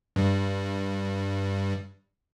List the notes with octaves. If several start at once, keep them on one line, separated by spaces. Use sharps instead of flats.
G2 G3